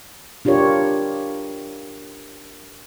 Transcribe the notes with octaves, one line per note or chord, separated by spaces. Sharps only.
D4 F4 G4 A#4 C#5